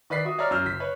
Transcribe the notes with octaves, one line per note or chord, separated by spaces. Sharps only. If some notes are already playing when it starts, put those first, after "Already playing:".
D#3 B4 D5 B6 C7
F#4 E5 D#6
C#5 D5 E5 A#5 F6
F#2 E6 F6 G6
F#1 B6
B4 C#5